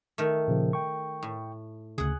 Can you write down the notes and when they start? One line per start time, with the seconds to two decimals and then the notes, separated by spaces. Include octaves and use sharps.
0.18 D#3 A3
0.48 A#2 C#3 F3
0.73 G5 C#6
1.23 A2
1.98 D2 C#3 G#4 F#5